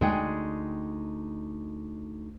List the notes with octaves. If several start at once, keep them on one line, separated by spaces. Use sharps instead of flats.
D2 G#3 D#4 G#4 D5 F#5 G5